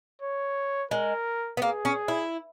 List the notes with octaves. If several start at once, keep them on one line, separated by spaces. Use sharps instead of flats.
C#5
G#3 A#4
B3
A#3 G#4
C#4
E4